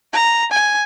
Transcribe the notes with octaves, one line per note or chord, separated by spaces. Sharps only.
A#5
G#5